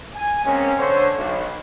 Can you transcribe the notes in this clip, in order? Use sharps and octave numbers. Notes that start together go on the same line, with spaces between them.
G#5
G#3 A#3 C4 C#4
D3 C5 C#5
B1